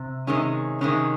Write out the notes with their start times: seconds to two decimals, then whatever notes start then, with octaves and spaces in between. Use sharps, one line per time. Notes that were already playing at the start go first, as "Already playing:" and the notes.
Already playing: C3
0.27 C3 D#3 G#3 C#4
0.81 C3 D#3 G#3 C#4